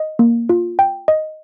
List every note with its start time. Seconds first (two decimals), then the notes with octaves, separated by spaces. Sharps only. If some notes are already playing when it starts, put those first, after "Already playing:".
Already playing: D#5
0.19 A#3
0.49 F4
0.79 G5
1.08 D#5